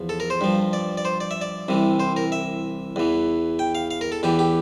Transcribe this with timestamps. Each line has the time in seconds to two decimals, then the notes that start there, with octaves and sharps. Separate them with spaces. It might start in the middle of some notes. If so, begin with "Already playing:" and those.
Already playing: E2 F3
0.09 A4
0.20 A#4
0.30 C5
0.41 G2 F3
0.73 D5
0.98 D5
1.05 C5
1.20 D5
1.31 E5
1.41 D5
1.68 C2 C3 E3
2.00 C5
2.16 A#4
2.32 E5
2.96 E2 E3
3.59 G5
3.75 F5
3.91 F5
4.01 A#4
4.12 A4
4.23 E2 E3 G4
4.39 G4